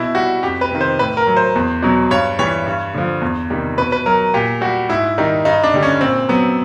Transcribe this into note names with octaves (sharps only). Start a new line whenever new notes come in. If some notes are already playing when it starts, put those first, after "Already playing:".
Already playing: B2 E4
G3 F#4
F2 G4
B4
C3 D#3
C5
A2 B4
A#4
F#3
C5
E2
B2 F#3
G2 C#5
E3 G3 C#5
G2
D3 F3
E2
C3 D#3 G3
B2 B4
B4
F#3 A#4
A#2 G4
G3 F#4
G#2 E4
D#3 G3 D#4
G2 D#4
D4
D3 G3
C#4
A#2 C4
F#3 B3